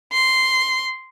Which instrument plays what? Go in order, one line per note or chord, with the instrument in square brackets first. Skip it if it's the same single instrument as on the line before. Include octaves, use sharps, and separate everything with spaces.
[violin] C6